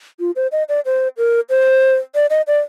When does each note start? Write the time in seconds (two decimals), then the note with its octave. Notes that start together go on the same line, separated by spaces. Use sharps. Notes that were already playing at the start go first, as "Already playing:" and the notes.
0.20 F4
0.36 C5
0.52 D#5
0.69 D5
0.85 C5
1.17 A#4
1.50 C5
2.15 D5
2.30 D#5
2.47 D5